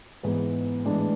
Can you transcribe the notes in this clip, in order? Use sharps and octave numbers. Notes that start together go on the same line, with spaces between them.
G#2 E3 G#3 B3
A2 E3 G#3 D4